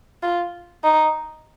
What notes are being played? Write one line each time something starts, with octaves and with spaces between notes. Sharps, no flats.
F4
D#4